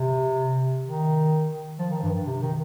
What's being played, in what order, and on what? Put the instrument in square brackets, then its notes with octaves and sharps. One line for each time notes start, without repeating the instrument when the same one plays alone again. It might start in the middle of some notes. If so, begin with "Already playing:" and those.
Already playing: [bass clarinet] C3
D#3
F3
D#3
G2
C3
D#3